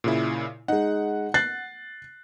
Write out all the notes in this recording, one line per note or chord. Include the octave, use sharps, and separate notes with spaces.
A#2 C#3 E4
G#3 D#4 F#5
F#6 A6 C7